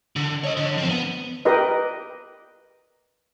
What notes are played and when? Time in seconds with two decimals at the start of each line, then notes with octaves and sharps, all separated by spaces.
0.16 D3
0.44 C#5 D#5
0.57 D3
0.78 F3 C4
0.89 B3
1.45 G4 A#4 B4 D#5